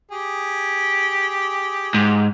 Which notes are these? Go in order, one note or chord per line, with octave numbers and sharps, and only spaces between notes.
G4 G#4
G#2